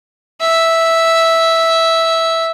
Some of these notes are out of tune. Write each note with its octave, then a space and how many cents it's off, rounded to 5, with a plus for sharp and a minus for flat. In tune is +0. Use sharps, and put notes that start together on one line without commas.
E5 -5